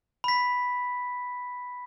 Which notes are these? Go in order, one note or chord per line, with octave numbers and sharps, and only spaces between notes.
B5 B6